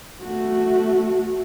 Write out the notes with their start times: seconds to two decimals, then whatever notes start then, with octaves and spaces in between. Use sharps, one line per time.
0.21 A3 F#4